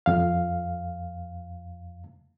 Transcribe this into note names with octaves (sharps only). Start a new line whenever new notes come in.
F2 F5